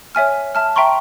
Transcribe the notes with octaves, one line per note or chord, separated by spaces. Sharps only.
C#5 E5 G#5 F6
E5 A5 F6
E5 G5 A#5 C6 C#6